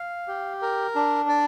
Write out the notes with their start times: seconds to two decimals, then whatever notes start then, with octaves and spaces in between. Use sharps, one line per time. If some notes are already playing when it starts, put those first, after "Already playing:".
Already playing: F5
0.28 G4
0.62 A#4
0.95 D4
1.29 D5